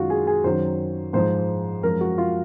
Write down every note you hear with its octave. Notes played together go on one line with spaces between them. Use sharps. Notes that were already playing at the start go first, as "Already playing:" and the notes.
Already playing: F#2 D#3 G#3 F4 F#4
G#4
G#4
F#2 D#3 F#3 C5
G#2 F3 G#3 C5
F#2 F3 G#3 A#4
F#4
F4